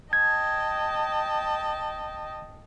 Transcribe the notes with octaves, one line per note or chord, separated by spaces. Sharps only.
D#5 G5 A5 G#6